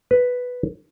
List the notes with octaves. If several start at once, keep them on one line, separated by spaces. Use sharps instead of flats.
B4